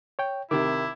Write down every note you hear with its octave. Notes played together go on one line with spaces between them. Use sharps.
C#5 G5
C3 D#3 E4 D6